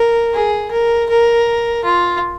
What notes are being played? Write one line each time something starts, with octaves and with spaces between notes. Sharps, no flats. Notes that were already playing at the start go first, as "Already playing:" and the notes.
Already playing: A#4
G#4
A#4
A#4
F4